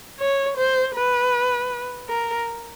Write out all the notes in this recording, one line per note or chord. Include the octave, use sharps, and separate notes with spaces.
C#5
C5
B4
A#4